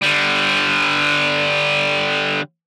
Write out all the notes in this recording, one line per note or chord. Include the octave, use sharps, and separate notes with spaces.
D3 G3